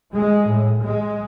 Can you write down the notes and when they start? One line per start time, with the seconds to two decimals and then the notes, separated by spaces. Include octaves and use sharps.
0.14 G#3
0.49 A2
0.83 G#3